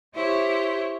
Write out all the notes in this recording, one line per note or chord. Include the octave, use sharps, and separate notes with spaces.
E4 G4 C5 C#5